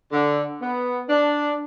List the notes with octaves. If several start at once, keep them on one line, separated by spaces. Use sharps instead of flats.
D3
B3
D4